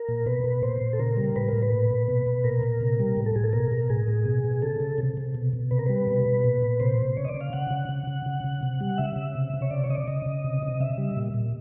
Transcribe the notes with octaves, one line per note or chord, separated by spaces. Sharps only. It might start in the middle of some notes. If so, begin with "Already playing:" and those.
Already playing: A#4
A#2
B2 B4
B2
A#2 C5
A#2
A4
C#3 A#4
G3
A2 B4
A2 A#4
B4
A#2
A#2
B2
B2
A#2 A#4
A#2
C3
G3
A2
A4
A2 G#4
A4
B2 A#4
B2
A2 G#4
A2
B2
B2
C#3 A4
C#3
C3
C3
B2
B2
C3 B4
A#4
G3 B4
B2
B2
A#2
A#2
C3 C5
C3
C#3 C#5
D#5
D5
C#3
F5
C#3 F#5
C#3
C#3
C#3
C#3
C#3
C3
G3
C#3 E5
C#3
C3
C3
C#5
C#3 D5
C#5
C#3 D#5
D5
C#3 D#5
C#3
C3
C3
C#3 E5
G3
A#2
A#2